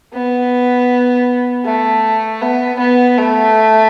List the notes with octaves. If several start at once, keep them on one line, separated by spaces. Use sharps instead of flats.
B3
A3
B3
B3
A3